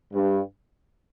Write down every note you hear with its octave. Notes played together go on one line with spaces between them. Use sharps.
G2